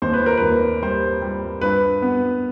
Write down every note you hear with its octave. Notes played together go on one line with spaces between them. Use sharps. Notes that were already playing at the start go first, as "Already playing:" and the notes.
D#2 C5
B4
A#4
D#2 B4
G3 C5
G3
G2 B4
B3